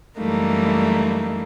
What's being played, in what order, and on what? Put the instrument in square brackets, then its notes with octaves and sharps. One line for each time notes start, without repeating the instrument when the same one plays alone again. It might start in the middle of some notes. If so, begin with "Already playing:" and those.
[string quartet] F#2 E3 G3 A3 A#3 D#4